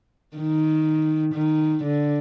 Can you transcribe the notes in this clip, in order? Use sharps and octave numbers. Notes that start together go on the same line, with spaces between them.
D#3
D#3
D3